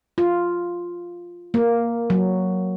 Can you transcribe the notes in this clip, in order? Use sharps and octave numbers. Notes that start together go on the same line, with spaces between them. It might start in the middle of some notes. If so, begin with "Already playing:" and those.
F4
A#3
F#3